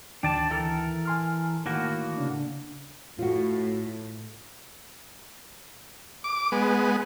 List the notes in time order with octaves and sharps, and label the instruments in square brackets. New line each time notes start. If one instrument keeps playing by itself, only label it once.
[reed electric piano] D2 D#3 G5 [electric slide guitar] D4 D5 A5
[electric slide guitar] E3 A4 A#4
[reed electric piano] G#5 C6 F6
[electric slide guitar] A2 A#3 F#4 [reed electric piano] D#3
[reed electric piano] C#3 D4
[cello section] A2 [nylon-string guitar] F4 F#4
[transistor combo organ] D6
G#3 B3